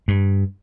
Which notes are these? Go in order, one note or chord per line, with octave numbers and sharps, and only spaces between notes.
G2